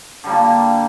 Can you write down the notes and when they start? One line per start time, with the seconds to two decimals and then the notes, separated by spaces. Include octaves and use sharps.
0.24 D3
0.26 G3
0.29 A#3
0.32 A#2